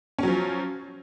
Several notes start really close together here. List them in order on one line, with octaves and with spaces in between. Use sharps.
C#4 F#3 F3